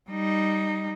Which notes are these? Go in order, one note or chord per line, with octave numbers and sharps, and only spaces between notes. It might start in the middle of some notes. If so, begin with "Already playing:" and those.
G3 D#4